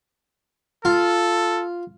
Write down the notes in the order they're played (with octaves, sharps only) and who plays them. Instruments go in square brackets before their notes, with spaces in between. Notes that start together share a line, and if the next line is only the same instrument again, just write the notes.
[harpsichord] F4 [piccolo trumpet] A4